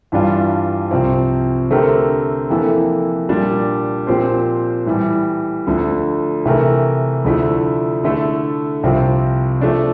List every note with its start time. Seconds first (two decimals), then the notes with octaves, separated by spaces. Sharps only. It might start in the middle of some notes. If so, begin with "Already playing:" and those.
0.12 G2 E3 G3 D4 F4
0.91 C2 C3 F3 C4
1.70 D3 A3 C4 G4 A#4
2.50 F2 E3 A#3 E4 A4
3.29 A#2 G3 D4
4.07 A#2 F3 C4 G4 C5
4.86 A2 E3 G3
5.67 D2 D3 F3
6.46 C3 E3 A3 E4 A#4
7.24 D2 D3 F3 A3 E4
8.04 D3 A3 E4 A4
8.83 C2 C3 F3 C4 F4
9.61 F3 A3 D4